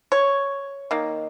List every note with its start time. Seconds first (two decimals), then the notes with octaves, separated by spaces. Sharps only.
0.12 C#5
0.91 D#3 A#3